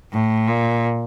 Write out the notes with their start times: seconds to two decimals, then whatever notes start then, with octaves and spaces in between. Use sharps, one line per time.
0.12 A2
0.48 A#2